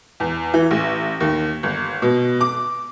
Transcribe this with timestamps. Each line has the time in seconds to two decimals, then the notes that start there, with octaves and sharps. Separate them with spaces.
0.20 E2
0.54 E3
0.71 A1
1.20 D#2
1.63 G1
2.02 B2
2.41 D6